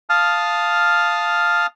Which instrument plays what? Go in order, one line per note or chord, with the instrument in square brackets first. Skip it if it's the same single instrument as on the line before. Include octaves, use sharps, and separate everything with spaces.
[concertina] F5 A5 D#6 F6